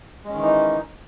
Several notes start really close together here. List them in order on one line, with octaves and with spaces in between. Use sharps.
G#3 C#4 D#3 E3 D#4